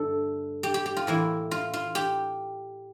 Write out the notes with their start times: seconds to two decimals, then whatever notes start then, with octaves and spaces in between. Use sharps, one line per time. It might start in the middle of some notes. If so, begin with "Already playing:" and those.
Already playing: G2 D3 A3 A4
0.63 G4
0.74 G4
0.86 G4
0.97 F4
1.07 A2 E3 A#3 E4
1.51 F4
1.73 F4
1.95 G4